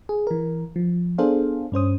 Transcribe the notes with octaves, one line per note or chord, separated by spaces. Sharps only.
G#4
E3 A#4
F3
B3 D4 G#4 A4 C5 F5
G2 C#4 C5 D#6